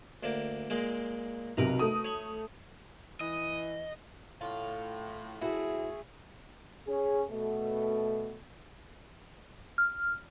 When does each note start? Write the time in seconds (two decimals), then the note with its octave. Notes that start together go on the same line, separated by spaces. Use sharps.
0.23 D2 D3 A#3
0.70 A#2 G#3 A#3
1.57 B1 C3 A#4 B4 A#5
1.79 A3 D#6
2.05 C#5 B5 C#6
3.21 E3 D#5
4.41 A2 F4
5.41 A3 C4 E4 F#4 G#4
6.87 C#4 G#4
7.29 B2 A3
9.78 F6